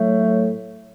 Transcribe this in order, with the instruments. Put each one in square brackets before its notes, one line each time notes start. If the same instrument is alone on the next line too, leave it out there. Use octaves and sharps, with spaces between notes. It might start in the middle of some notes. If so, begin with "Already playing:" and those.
Already playing: [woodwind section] A2 F#3 A3